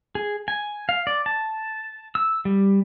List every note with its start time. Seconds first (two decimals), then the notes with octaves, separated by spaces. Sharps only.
0.15 G#4
0.48 G#5
0.89 F5
1.07 D5
1.26 A5
2.15 E6
2.45 G3